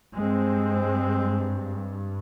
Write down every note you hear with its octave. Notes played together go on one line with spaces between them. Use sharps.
G2 G#3 C4